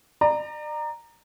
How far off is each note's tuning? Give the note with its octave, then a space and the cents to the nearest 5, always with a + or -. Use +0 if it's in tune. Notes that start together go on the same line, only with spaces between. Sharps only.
D5 +35 A#5 -5